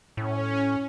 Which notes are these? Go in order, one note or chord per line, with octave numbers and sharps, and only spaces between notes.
A2 C#4